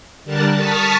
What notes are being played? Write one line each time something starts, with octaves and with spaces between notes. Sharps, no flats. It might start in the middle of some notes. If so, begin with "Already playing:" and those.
D3 G3 A#4 A5 F#6 A6
A5 C#6 D#6 F6 A6 B6